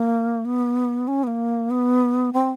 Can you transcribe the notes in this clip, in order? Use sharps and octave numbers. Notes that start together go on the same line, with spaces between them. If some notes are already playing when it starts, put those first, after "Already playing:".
Already playing: A#3
B3
C#4
B3
A#3
B3
C4